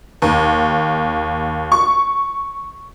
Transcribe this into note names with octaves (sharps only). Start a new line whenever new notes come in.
D#2
C#6